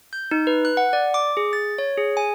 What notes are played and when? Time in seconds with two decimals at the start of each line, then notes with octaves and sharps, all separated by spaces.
0.13 G6
0.31 D#4
0.47 B4
0.65 F#6
0.77 F#5
0.93 D5
1.14 D6
1.37 G#4
1.53 A6
1.78 C#5
1.98 G#4
2.17 G#5